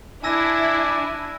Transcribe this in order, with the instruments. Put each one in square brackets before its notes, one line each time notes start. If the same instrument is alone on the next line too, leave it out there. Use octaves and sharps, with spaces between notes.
[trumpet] D4 [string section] E4 [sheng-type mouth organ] G#5 [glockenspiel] A5 E6 A#6